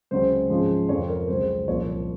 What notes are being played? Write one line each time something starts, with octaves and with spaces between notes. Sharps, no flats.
C#2 C3 F#3 C#4 C5
G#2 F3 G#3 C#4
F2 C3 F3 C4 C#5
A#4
C#2 C#3 F#3 C4 C5
C2 A#2 F3 C#5